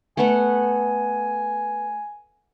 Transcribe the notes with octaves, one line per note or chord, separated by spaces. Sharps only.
A3 B3 F#5 G#5